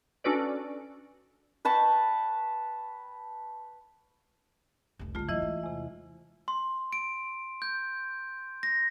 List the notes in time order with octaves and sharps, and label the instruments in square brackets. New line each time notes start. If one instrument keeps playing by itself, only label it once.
[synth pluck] C#4 D4 F#4 A4 B4 D5
[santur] B4 G5 A5 C#6
[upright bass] F1 C2
[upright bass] D2 G#3 [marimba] A3 F4
[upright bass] F2 F#3 [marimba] E3 E4 D#5
[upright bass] G#3
[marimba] E2 C3
[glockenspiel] C6
D7
G6
A#6